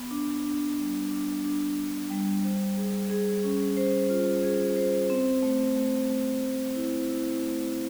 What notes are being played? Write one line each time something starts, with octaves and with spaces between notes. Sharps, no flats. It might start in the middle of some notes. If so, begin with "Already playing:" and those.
Already playing: B3
D4
D4
G3
D4
D4
D4
G3
C5
G#4
G#4
C#4
C5
F4
G#4
C5
C4
A3
A3
A3
A3
E4
E4
A3